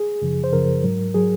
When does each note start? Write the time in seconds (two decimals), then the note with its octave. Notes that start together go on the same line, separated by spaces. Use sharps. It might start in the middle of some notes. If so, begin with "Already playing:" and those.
Already playing: G#4
0.22 F#2 C#3 F3
0.44 C5
0.52 F#2 C#3 F3 A#4
0.84 G#2 F#3
1.14 F#3 G#4